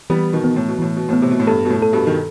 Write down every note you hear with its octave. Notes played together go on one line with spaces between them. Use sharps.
E3 G3 B3
B2 D#3
B3
A2
B2
A2 E3
B2
A2 B3
C3
B2
A2
G2 A4
B2
A2
A4
G2 B2
D#3